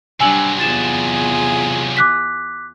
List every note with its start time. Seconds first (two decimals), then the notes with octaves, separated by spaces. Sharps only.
0.20 C3 F#3 G3 D4 G#5 E6 F#7
0.60 E2 F4 G#4 A6 E7
1.97 D6 F#6 B6